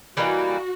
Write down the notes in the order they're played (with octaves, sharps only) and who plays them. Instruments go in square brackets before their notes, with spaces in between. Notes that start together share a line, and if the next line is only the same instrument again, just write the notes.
[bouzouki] E3 G3 A#3 D#4 [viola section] F#4